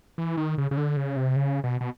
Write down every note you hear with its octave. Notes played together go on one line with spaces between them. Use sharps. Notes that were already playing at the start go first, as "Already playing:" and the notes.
E3
D#3
C#3
C#3
D3
C#3
C3
C#3
B2
B2